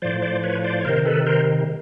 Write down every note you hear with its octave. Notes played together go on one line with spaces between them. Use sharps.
A2 F3 C5 D5
C5 D5
B4 C#5
C5 D5
C#5
C3 D#3 A#4 C5
A4 B4
A#4 C5